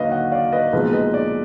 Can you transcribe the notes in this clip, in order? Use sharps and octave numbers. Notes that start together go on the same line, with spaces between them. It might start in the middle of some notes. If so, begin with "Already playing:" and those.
Already playing: D#2 D3 F#3 B4 D#5 F5
D#5 F#5
D5 F5
B4 D#5
B1 A#2 F3 G#3 B4
B4 D#5
D5